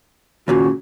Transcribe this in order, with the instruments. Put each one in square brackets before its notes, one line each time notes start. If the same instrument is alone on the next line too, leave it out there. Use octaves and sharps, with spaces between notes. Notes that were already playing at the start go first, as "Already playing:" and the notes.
[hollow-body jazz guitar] D#2 A#2 C#3 [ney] F#4